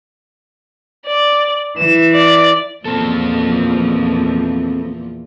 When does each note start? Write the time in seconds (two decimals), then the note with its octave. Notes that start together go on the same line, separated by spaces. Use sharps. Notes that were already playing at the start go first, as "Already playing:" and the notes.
1.06 D5
1.78 E3 E7
2.13 D5
2.85 E2 A#2 F3 C4 A4